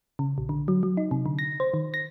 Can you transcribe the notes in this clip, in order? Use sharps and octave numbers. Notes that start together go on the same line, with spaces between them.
C#3
A#1
D3
F#3
F#3
D#4
C3
D3
A#6
C5
D#3
A#6